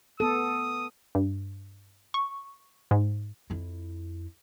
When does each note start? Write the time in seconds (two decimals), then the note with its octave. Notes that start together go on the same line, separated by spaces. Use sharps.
0.20 B3 A4 D#6
1.15 G2
2.14 C#6
2.91 G#2
3.50 F2 E4